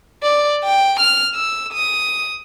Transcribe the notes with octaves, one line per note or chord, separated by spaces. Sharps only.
D5
G5
F6
E6
D#6